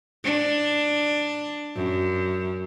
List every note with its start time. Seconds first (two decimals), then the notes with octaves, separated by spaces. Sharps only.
0.24 D4
1.76 F#2